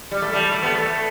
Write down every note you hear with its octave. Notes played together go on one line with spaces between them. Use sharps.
G3
A3
G3
A3
B3
A3